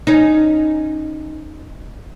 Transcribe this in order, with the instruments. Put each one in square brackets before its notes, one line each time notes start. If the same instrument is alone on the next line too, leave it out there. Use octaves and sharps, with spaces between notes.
[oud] C#4 D#4